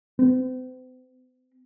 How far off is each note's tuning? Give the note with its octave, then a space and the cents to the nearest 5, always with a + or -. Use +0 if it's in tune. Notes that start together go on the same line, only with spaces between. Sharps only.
C4 -45